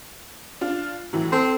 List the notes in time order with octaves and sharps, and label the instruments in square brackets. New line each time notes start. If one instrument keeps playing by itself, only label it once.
[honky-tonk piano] D4 F4
A2 E3 F#3
[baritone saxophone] C4 [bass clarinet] A4 [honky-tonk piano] C6